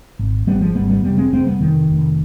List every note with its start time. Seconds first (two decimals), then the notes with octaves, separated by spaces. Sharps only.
0.19 G#1
0.47 G#1 G3 B3
0.61 F3 G#3
0.75 G#1 G3 B3
0.89 G3 B3
1.04 F1 G3 B3
1.18 G#3 C4
1.32 F1 G#3 C4
1.46 G3 B3
1.61 F1 D#3
1.89 F1